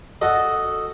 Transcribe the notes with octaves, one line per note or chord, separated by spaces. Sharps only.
F#4 A4 D#5